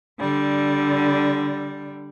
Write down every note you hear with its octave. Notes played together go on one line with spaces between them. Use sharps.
D3 G3